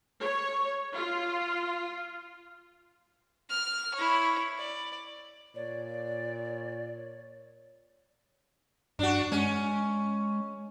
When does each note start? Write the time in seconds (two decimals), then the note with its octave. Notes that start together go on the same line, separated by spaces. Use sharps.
0.20 C#5
0.94 F4
3.50 F6
3.95 E4 C#5
4.58 D5
5.55 A#2 C#5 D5
8.99 G2 D4 F#4
9.32 G#3 C#4